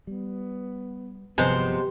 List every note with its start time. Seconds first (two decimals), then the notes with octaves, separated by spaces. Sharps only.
0.07 G3 B3
1.38 G1 C3 F3 F#3 G#3 B3 C5